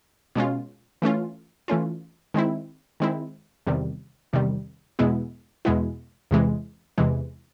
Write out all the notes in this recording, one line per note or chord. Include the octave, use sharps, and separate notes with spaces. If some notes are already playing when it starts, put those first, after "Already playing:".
B2 G#3 C#4 F4
E3 A3 C#4 F4
E3 A3 C#4 F4
D#3 G#3 C4 E4
D#3 G#3 C4 E4
E2 C3 D#3 G3
E2 C3 D#3 G3
E2 B2 G#3 B3 E4
E2 B2 G#3 B3 E4
E2 C3 E3 G#3
E2 C3 E3 G#3